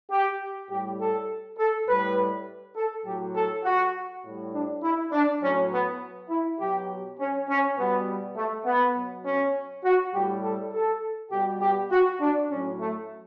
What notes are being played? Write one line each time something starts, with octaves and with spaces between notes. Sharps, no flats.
G4
A2 G3 G4
A4
A4
A2 G3 B4
A4
A2 F#3 G4
A4
F#4
A2 G3
D4
E4
D4
A2 F#3 C#4
B3
E4
B2 F#3 G4
C#4
C#4
B2 G3 B3
A3
B3
B2 F#3
C#4
F#4
A2 G3 G4
A4
A4
B2 G3 G4
G4
F#4
D4
A2 F#3 C#4
A3